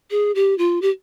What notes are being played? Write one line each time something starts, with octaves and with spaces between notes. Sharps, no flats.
G#4
G4
F4
G4